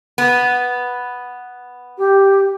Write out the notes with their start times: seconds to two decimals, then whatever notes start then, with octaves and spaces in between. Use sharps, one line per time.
0.18 B3
1.97 G4